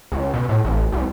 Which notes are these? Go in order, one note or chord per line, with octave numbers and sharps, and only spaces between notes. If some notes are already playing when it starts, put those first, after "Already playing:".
C#2
B2
A2
A1
C2